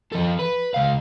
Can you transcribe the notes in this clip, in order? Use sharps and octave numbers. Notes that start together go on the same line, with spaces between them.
F3 A4
B4
C#2 F5